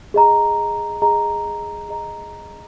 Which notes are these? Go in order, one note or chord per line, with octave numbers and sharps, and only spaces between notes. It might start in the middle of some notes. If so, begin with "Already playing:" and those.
G#4 D#5 A#5
G#4 D#5 A#5
G#4 D#5 A#5